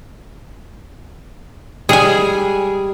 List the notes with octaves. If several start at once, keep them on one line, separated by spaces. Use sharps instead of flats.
G3 G#3 G#4 G#5